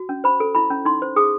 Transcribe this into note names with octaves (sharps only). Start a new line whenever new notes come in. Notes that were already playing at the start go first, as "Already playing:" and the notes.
Already playing: F#4
C#4
C5 B5
A4
E4 B5
C#4
D#4 C6
C5
G#4 D#6